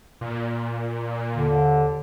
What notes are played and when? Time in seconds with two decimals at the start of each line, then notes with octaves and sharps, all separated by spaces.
0.21 A#2
1.34 D#2 D3